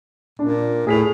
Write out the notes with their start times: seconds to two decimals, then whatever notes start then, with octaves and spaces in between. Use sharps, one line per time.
0.39 A#2 D4
0.87 A2 G#4 B6 F7